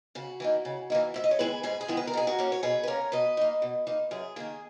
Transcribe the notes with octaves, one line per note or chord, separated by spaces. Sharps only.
C#3 F#4
E3 A#3 D#4
C#3
E3 A#3 D#4
G#2 E5
D#5
C#5
D#3 G#3 B3 E4 G#4 B4
G#2 G#4 B4
G#4
D#3 G#3 B3 E4
B4
A#4
B2 G#4
F#4 A#4
A#3 C#4
C#5
B2 G#4 B4
B4
A#3 C#4 A#4 C#5
B2 B4 D#5
A#3 D#4
B2
A#3 D#4
F#2 G#4
D#3 A#3 G#4